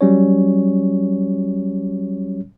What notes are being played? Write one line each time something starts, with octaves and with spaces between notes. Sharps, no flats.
F#3 G3 C#4 C#5